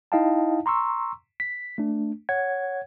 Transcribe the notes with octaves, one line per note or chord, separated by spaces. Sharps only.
D#4 E4 D#5 F5 G5 A5
A#5 C6 C#6 E6
B6
A3 D4
C#5 F#5 G#6